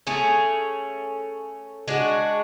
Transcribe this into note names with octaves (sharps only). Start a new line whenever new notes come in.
A3 C#4 G#4
G#3 D4 F#4